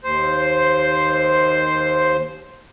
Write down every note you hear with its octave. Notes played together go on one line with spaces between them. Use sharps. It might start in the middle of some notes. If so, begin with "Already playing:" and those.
D#2 C5